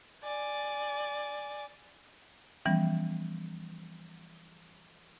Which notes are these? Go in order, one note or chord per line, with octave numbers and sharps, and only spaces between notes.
D5 G#5
E3 F3 G3 B3 C#4